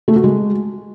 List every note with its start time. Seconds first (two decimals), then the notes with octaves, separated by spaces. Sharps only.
0.08 A3
0.16 F#4
0.24 G#3